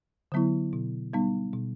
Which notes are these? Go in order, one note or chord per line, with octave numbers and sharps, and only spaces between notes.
D3 F#3 B3 E4
B2
G3 B3 D#4
B2